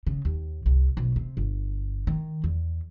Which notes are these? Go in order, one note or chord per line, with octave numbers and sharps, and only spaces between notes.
C#3
D#2
C2
B1
C3
G1
D#3
E2